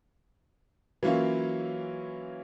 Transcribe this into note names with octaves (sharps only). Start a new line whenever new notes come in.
E3 F#3 A#3 C#4 E4 F4